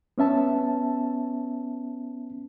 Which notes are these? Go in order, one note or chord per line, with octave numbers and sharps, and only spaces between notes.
B3 C#4 E5 A5